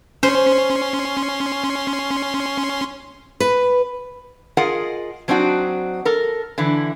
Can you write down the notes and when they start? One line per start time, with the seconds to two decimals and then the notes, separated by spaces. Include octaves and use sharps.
0.23 C#4 C5 C6
3.40 B4
4.57 F4 G#4 A#4 D#5 F#5
5.28 F#3 C4 D4 D#4 F#4
6.05 A4 A#4
6.58 D3 E3 E4